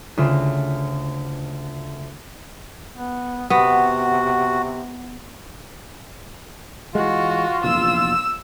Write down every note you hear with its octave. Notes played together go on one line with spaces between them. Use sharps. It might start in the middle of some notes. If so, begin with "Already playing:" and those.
D2 C#3 F4 E7
B3
C3 B3 F#4
E3 G#3 F4 F#4
F1 A#1 E2 E6